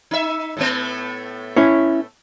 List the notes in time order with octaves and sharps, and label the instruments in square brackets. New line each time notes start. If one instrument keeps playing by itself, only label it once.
[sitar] D#4 E5
A2 A3 B3
[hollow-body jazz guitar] C#4 E4 C#5